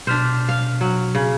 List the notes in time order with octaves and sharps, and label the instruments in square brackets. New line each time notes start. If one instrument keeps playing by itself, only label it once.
[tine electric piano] B2 F6 B6 [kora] D4 C5
[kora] F5
F#3
C#3